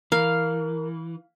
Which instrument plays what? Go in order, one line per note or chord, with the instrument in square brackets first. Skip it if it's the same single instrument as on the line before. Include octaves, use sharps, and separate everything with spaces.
[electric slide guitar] E3 [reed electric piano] A#4 [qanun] F5